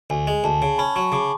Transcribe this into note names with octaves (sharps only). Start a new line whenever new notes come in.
D2 G#5
G#3
D2 A5
C#3
C#4 B5
F#3 C#6
C#3 D6